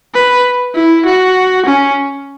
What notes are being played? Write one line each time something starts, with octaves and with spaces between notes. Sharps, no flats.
B4
E4
F#4
C#4